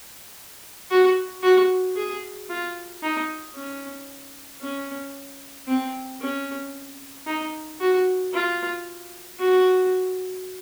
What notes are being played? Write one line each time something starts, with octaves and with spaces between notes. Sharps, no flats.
F#4
F#4
G#4
F4
D#4
C#4
C#4
C4
C#4
D#4
F#4
F4
F#4